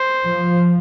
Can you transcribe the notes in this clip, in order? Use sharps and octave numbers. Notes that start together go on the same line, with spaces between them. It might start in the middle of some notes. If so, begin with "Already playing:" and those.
Already playing: C5
F3